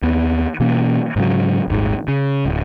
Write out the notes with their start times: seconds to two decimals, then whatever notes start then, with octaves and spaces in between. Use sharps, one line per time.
0.03 D#2 B3
0.60 B2 E3 A#3 C#4
1.16 G#2 C#3 F#3
1.68 D#1 G#1 G#2
2.08 C#3
2.46 D1